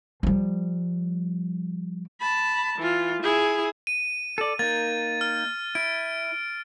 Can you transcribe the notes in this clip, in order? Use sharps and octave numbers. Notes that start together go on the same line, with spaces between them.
F3 G3
A5 B5
E3 F4
E4 G#4
D#7
A4 D5
A#3 D#4 A6
F6
E4 D7